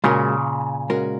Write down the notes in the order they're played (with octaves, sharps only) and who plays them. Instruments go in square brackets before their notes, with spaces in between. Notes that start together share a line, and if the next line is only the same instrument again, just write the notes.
[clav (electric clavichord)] A#2 C#3 [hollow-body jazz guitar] G#3 C#4 F#4 A#4
[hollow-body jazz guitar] G#3 C#4 F#4 A#4